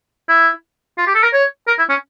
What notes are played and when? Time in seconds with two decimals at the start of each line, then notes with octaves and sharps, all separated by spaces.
0.29 E4
0.98 F4
1.07 G4
1.15 A4
1.23 A#4
1.33 C#5
1.68 A#4
1.78 E4
1.89 C#4